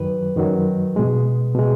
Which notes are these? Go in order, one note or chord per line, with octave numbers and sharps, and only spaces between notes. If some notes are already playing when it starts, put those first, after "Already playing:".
Already playing: F#2 D#3 F#3 B4
F#2 D#3 F#3
B2 G#3
B2 G#3